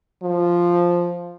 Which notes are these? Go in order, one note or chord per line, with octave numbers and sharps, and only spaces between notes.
F3